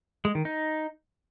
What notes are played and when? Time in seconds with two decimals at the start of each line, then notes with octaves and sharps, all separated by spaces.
0.25 G#3
0.35 D#3
0.45 D#4